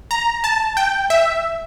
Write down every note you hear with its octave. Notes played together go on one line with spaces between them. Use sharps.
A#5
A5
G5
E5